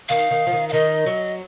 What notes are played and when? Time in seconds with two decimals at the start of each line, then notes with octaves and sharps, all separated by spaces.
0.09 D#3 F5
0.31 D#3
0.47 F3
0.53 D#3
0.69 F5
0.73 D#3 D#5
1.06 F#3